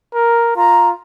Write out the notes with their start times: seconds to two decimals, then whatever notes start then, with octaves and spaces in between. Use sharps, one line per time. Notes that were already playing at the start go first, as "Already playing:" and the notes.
0.14 A#4
0.56 F4 A#5